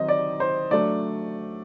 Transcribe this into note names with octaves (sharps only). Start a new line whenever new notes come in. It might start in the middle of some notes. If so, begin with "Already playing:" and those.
Already playing: D#3 F#3 C4 D#4 D#5
D5
C5
F#3 A3 D4 D5